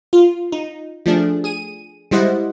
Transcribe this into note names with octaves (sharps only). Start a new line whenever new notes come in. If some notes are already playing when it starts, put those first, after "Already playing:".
F4
D#4
F3 A3 D4 G#4
G#4 D#7
G3 G#3 E4 C5 D#5 F#5